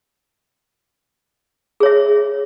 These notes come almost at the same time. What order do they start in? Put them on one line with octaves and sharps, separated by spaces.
G#4 C#5 E5